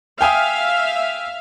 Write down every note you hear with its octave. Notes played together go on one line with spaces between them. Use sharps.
E5 F5 G5 G#5 D#6